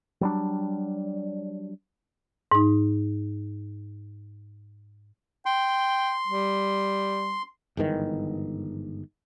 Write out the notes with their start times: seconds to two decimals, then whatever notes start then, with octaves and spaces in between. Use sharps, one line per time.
0.21 F#3 G3 D4
2.52 G#2 D#4
5.46 G5 C6
6.27 G3
7.77 G1 G#2 D#3 E3